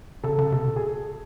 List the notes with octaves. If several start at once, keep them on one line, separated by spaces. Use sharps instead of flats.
C#3 A4
C#3
C3
A#2
G#4